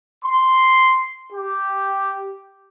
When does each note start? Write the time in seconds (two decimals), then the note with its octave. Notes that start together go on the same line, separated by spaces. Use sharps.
0.24 C6
1.32 G4